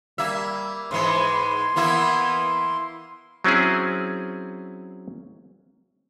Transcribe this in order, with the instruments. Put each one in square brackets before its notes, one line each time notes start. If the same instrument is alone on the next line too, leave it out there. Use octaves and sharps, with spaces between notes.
[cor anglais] G3 [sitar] A#3 E5
[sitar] G#2 E3 G#3 [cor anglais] B4 [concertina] C6
[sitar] E3 A#3 E4 [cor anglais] B3
[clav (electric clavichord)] F#3 C4 C#4 E4 G#4